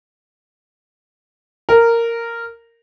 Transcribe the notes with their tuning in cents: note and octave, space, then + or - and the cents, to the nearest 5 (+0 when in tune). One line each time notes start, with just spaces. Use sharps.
A#4 -10